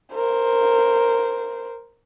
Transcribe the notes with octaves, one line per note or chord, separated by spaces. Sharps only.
A#4 C5